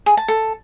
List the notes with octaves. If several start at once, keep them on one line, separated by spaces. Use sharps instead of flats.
G#4
A5
A4